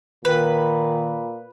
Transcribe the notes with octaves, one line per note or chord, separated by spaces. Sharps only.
A#2 D#3 B4